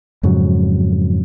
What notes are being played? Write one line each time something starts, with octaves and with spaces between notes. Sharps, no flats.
F2 G#2 C#3 F#3